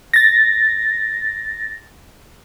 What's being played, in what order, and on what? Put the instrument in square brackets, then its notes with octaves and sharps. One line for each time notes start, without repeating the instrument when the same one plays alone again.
[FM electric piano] A6 A#6